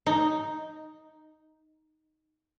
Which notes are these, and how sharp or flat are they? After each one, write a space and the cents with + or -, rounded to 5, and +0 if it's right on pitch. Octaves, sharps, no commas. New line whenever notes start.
D#4 +0